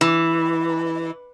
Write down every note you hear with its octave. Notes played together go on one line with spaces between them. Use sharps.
E3